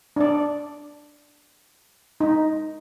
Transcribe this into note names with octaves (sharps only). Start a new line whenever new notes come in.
D4 D5
D#4